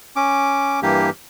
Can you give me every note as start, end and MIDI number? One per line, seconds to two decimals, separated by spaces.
0.16 0.80 61
0.16 0.80 86
0.82 1.10 43
0.82 1.10 52
0.82 1.10 58
0.82 1.10 67